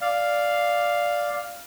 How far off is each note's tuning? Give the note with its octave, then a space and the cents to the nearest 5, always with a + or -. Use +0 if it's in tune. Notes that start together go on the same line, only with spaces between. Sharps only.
D5 +0 F5 +0